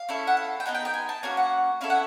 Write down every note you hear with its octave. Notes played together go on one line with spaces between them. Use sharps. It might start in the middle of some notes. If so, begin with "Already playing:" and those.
Already playing: F5
C#4 E4 A4
F#5
F5
G5
B3 D#4 G#4 F#5
G5
G5
G#5
A5
A#3 C#4 F#4 G#5
F#5
C#4 E4 A4 F5
F#5